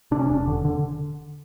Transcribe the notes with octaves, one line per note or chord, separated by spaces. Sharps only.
C3 D4
C#4
E1 D4
D3
D3